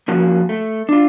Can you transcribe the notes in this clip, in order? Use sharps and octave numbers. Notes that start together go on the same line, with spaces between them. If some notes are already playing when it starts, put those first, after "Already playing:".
F3 A#3 C#4 F#4
A3
D4 F4